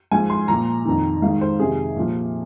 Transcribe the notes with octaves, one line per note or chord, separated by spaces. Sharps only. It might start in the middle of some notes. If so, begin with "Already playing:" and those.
G#2 F3 G#5
C6
A#2 F3 A#5
F2 D#3
G#2 D#3 F5
C5
F2 C3 D#3 G#4
A#2 F3